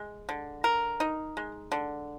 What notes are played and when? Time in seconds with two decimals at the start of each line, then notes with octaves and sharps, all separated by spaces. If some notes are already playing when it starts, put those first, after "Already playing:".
Already playing: G#3
0.29 D3
0.64 A#4
1.00 D#4
1.37 G#3
1.72 D3